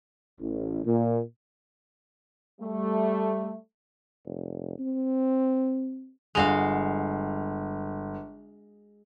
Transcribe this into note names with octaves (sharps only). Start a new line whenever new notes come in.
A1
A#2
G3 A3
F1
C4
G1 G#3 F#4 F5 F7